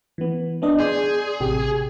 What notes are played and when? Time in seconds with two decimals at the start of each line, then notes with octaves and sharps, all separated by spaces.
0.18 E3 B3
0.62 B3 D4 D#5
0.80 G#4 D5 C6 G6
1.40 A1 C3 G4